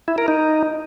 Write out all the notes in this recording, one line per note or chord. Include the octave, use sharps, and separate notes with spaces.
E4
A#4
D#4